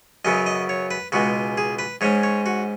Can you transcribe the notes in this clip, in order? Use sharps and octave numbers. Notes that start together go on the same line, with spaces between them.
F#2 C#3 F#3 B3 D#5
D#5
C#5
B4
C#2 B2 G#3 F#4
G#4
B4
G#2 G#3 C#4 C#5
C#5
F#4